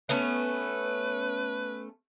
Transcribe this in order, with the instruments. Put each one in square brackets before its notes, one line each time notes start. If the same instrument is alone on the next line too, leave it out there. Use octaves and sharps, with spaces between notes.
[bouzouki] A3 B3 C#4 [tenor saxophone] B4